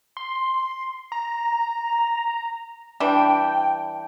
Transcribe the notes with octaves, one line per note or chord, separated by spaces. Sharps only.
C6
A#5
E3 G3 D4 G5